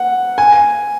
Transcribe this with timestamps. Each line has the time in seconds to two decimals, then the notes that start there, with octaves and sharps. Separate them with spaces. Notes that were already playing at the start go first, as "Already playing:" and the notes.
Already playing: F#5
0.38 G#5